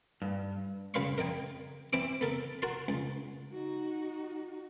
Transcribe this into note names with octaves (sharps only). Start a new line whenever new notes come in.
G2
F#2 C#3 B4 F5 C6 C#6
A#4 D#5 G5 G#5
E3 C4 E4 D6
B3 A4 A#4
F#4 A#4 A5 C6
C#2
D#4 F#4